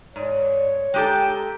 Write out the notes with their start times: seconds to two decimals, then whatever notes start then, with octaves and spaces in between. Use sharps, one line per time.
0.16 G#2 C#5 D5
0.94 G#3 G4 A4 G5 A#5